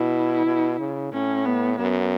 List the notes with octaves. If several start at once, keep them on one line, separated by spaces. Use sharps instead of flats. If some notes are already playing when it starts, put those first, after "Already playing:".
Already playing: B2 E4
B2
C#3
A2 C#4
B3
F#2 B3